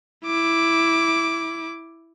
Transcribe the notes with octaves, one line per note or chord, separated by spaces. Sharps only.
E4 D6